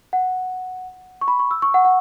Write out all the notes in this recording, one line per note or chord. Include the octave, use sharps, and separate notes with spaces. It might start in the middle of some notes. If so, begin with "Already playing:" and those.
F#5
C#6
B5
C#6
E6
C#6
F#5
F#5